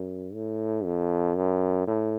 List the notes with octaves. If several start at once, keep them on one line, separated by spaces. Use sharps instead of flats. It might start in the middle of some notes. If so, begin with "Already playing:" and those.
Already playing: F#2
A2
F2
F#2
A2